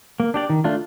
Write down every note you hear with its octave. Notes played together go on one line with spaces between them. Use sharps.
A#3
D4 G4 D5
D#3
A3 D4 F4